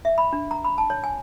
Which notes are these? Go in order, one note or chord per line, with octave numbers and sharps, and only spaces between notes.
E5
B5
D4
A#5
B5
A5
C#5
G#5